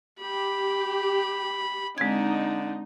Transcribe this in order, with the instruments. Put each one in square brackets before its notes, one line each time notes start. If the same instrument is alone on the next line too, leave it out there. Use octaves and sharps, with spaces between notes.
[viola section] G4 [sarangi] B5
[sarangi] D3 [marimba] G#3 C4 G#6 [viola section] D#4